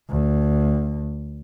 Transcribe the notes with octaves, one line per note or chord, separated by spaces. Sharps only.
D2